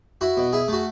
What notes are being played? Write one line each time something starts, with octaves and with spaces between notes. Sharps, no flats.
E4 F#4
B2
E4 G#4
A3 F#4